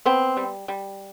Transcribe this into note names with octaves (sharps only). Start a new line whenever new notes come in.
B3 C4
G3
G3